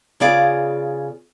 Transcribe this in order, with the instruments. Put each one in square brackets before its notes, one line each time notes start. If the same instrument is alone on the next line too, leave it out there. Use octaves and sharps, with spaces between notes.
[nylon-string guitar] C#3 B3 F4 G#4 D5 F5